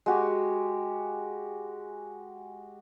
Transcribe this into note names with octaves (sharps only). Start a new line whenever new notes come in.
G#3 F#4 G4